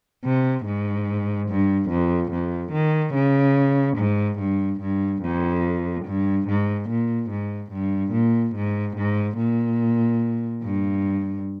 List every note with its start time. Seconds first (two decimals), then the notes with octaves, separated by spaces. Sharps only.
0.24 C3
0.66 G#2
1.48 G2
1.90 F2
2.31 F2
2.73 D#3
3.14 C#3
3.97 G#2
4.39 G2
4.81 G2
5.22 F2
6.06 G2
6.48 G#2
6.89 A#2
7.30 G#2
7.72 G2
8.13 A#2
8.55 G#2
8.96 G#2
9.38 A#2
10.63 G2